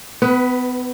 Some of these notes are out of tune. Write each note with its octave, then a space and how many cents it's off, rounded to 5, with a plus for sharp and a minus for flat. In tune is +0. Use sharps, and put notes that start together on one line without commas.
B3 +30 B4 +0